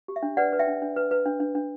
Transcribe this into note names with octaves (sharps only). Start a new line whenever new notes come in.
G4
E5
D4
B4 D5 F#5
B4
E5 G5
D4
D4
B4
B4
D4
D4
D4